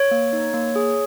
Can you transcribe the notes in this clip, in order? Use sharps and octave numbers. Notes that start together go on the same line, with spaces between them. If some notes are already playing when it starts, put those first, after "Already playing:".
Already playing: C#5
A#3
D#4
A#3
G#4